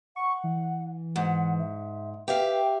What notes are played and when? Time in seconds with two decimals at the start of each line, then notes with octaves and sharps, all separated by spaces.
0.16 F#5 C#6
0.44 E3
1.16 G#2 F#5
1.59 E5
2.28 G4 B4 E5 F5 G5